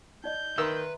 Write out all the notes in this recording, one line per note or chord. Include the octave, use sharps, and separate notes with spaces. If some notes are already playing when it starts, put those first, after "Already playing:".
D#4 D5 D#5 G6
D#3 B4 E5 A#5 C6 E6